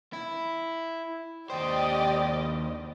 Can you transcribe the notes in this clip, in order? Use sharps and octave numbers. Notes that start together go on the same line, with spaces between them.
E4
D#2 G4 C5 D5 D#5